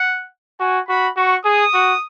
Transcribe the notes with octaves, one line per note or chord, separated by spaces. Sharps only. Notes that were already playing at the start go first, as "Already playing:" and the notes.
Already playing: F#5
F#4 G#5
F#4 B5
F#4 C#6
G#4 D#6
F#4